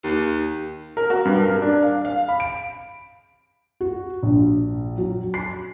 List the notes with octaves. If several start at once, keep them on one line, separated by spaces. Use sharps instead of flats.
D#2
A#4
F#4
G2
A#4
D4
F5
F5
B5
D7
F#4
A#1
F#3
C7